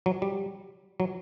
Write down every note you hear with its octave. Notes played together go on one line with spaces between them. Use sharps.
F#3
G3
F#3